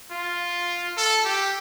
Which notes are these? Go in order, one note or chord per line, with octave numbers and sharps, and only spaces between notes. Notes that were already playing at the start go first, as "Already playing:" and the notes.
F4
A4
G4